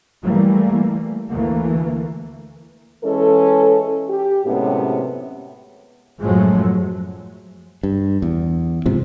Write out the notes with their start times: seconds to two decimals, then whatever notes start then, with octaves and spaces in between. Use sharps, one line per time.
0.23 E3 G3 A3 A#3
1.31 D2 E3 A3 A#3
3.04 E3 G#3 C#4 A4
4.09 G4
4.46 F#2 A2 C3 G#3 B3 C#4
6.21 F#2 A2 F3 F#3 G#3 A3
7.83 G2
8.22 E2
8.86 G#2 C3 F3